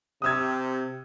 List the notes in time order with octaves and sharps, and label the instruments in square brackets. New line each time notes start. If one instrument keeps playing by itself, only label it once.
[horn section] C3 [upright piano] D#6 E6 G#6